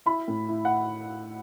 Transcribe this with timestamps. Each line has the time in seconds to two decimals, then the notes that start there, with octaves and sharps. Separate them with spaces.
0.06 E4 B5
0.28 A2
0.49 E4
0.65 F#5